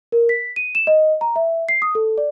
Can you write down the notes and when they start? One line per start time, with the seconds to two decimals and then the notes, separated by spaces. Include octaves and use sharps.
0.12 A#4
0.29 B6
0.56 D#7
0.75 E7
0.87 D#5
1.21 A#5
1.36 E5
1.69 C7
1.82 D#6
1.95 A4
2.18 D5